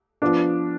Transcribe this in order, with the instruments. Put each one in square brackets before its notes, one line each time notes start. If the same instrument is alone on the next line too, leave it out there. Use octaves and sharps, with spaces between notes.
[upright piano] F3 B3 D4